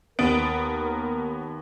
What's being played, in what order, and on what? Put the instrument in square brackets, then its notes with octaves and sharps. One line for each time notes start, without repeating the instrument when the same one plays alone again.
[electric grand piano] D#2 A6 D7 [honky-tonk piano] B3 [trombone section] A#4